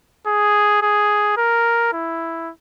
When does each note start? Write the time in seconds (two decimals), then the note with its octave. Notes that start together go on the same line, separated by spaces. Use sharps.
0.27 G#4
0.82 G#4
1.37 A#4
1.93 E4